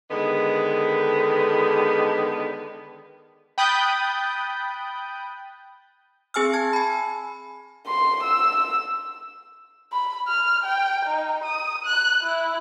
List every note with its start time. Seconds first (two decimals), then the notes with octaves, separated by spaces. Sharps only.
0.10 D3 D#3 G#3 B3
3.58 G5 B5 D#6 F#6 G6 A6
6.34 C4 G#4 G#5 E6 F6
6.53 A5 G#6
6.73 G#5 B5
7.87 C6
8.23 E6
9.92 B5
10.27 F6
10.64 G5
11.06 D#4
11.44 D#6
11.86 F#6
12.23 E4